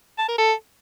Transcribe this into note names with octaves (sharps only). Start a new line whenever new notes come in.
A5
A#4
A4